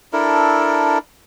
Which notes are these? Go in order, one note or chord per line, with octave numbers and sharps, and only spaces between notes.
D4 E4 A4 A#4